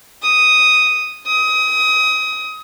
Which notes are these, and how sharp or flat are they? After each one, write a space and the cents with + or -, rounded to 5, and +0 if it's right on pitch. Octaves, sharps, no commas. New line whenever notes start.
D#6 +0
D#6 +25